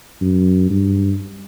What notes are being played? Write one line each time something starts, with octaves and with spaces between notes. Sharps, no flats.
F#2
G2